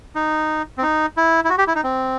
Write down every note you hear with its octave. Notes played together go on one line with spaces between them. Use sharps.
D#4
C4
D#4
E4
E4
F#4
G4
E4
D#4
C4